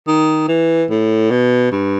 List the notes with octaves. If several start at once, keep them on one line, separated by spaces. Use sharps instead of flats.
D#3
E3
A2
B2
G2